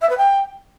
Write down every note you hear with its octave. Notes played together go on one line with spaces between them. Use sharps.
E5
B4
G5